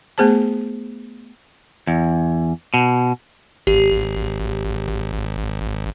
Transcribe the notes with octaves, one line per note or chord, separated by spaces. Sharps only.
A3 B3 G#4 C5 A5
E2
B2
G#1 G4